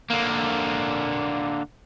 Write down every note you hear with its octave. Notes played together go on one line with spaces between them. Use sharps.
D3 A#3